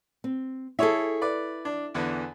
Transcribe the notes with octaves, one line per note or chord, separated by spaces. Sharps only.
C4
E4 G#4 A4 C#5 E5
B4 D5
D4
E2 D3 E3